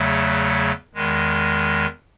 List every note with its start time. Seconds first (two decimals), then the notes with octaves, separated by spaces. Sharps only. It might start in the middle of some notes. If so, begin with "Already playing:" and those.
Already playing: E2 C#3 F#3 A3
0.95 E2 D#3 G#3